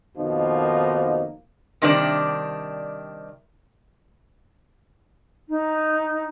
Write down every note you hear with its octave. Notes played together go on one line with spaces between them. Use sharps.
F2 B2 D#3 F3 A#3 D#4
C3 D#3 G3 D4 D5
D#4